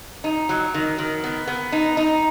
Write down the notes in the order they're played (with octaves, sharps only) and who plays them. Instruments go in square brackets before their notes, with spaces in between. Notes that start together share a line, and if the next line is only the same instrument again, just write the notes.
[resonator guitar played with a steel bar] D#4
F#3
D#3
D#3
B3
B3
D#4
D#4